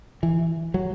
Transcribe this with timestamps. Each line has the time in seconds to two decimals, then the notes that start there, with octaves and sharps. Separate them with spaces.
0.23 E3
0.74 F#3